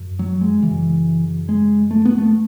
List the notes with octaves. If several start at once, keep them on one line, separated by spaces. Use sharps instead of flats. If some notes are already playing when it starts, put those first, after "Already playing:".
Already playing: F#2
F#3
G#3
F#2 C#3 E3
G#3
A3
B3
A3